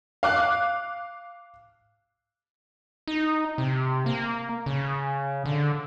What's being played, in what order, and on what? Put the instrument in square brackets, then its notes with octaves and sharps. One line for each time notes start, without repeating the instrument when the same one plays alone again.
[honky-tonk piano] F5 D6 F#6
[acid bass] D#4
C3
A#3
C#3
D3